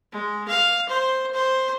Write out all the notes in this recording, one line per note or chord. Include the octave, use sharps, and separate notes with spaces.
G#3
F5
C5
C5